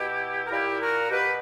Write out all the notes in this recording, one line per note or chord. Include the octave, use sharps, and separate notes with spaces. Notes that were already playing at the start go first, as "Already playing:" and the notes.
Already playing: B2 E4 G4
A#4
A#2 E4 G4
F#4 A#4
B2 G4 B4